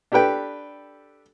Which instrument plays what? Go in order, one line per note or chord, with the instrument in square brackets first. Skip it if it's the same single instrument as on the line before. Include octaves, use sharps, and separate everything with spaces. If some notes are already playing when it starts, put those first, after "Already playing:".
[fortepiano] D4 G4 A4 B4 G5